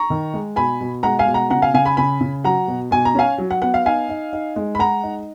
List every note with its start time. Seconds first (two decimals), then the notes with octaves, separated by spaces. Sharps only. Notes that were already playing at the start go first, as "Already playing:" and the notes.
Already playing: A#5 C#6
0.10 D#3
0.34 G#3
0.56 B2 G#5 B5
0.81 B2
1.03 G#3 F#5 A#5
1.19 F5 G#5
1.26 B2
1.34 F#5 A#5
1.50 C#3 F#5 A#5
1.62 F5 G#5
1.74 C#3 F5 G#5
1.85 G#5 B5
1.97 C#3 G#5 B5
2.21 C#3
2.44 F#3 F#5 A#5
2.68 B2
2.91 B2 G#5
3.05 A#5
3.15 C#4 F5 G#5
3.38 F#3
3.51 F#5
3.62 B3 F#5
3.74 F5
3.85 D#4 F5 G#5
4.09 D#4
4.33 D#4
4.56 G#3
4.75 B5
4.79 G#3 F#5 A#5
5.03 D#4